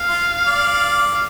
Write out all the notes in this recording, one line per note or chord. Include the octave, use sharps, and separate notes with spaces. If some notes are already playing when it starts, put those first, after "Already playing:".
Already playing: F5
F4
D5
F5